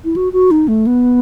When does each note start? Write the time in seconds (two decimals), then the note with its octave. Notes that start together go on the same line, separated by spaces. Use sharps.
0.05 E4
0.16 F#4
0.33 F#4
0.51 D#4
0.68 A3
0.87 B3